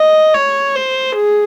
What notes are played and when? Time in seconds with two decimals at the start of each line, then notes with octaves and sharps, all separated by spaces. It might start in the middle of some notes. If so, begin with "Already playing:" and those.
Already playing: D#5
0.34 C#5
0.76 C5
1.16 G#4